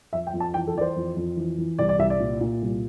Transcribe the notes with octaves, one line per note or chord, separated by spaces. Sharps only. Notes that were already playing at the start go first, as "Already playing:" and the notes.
F2 E5
G5
F2
A5
E3 G5
A4
E3 D5
C5
F2
F2
E3
E3
C2 D5
D5
C2 E5
D5
A#2
A#2
C2